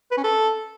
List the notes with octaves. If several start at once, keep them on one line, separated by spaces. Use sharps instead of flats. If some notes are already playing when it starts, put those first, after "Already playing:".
B4
C#4
A4